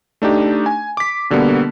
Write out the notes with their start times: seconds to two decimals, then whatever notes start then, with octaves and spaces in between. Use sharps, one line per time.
0.22 A3 D4 D#4 G4
0.66 G#5
0.97 D6 B6
1.30 B2 D3 G3 A#3 B3